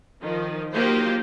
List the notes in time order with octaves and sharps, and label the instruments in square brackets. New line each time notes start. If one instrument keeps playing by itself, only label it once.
[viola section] D#3 F3
F#3 A#3 D#4 F4 G4 C5